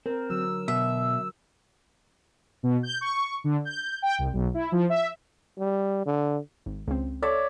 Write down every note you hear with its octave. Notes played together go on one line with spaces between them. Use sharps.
C4 A#4
D3 F#3 E6
B2 E5
B2
G6
C#6
D3
G6
G5
C2
B1
E4
F3
E5
G3
D3
G#1
C#2 C4
A4 C#5 D5 E5